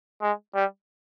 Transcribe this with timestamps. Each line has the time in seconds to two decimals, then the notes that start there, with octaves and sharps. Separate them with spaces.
0.22 G#3
0.55 G3